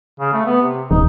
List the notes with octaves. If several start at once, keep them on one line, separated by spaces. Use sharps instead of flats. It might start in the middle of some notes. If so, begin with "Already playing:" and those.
C#3
A3
B3
C3
D#1 D#4